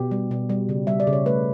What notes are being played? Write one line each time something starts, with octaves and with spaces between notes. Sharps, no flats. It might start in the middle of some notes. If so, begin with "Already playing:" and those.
Already playing: B2 G4
G3
B2
G3
C#3
G3 E5
D5
C#3
C#5
A3 B4